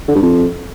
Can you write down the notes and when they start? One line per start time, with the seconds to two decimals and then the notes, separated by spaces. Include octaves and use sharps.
0.08 D3
0.15 G2
0.22 F2